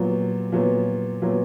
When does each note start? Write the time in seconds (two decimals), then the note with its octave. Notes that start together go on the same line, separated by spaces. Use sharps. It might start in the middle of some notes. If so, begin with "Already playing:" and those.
Already playing: A#2 F#3 B3
0.52 A#2 F#3 B3
1.22 A#2 F#3 B3